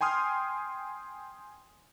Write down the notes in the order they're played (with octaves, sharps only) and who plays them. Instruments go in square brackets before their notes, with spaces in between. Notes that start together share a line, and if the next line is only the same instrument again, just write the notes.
[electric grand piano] G5 G#5 C6 D#6 F6